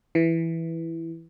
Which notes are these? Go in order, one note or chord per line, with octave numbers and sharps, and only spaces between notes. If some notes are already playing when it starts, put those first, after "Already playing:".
E3